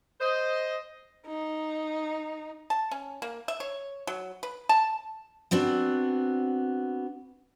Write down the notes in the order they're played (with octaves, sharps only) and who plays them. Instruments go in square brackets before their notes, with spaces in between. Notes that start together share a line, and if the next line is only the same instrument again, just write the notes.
[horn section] C5 D#5
[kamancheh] D#4
[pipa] A5
C#4
A#3
E5
C#5
F#3
B4
A5
[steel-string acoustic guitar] B3 C4 D4 F#4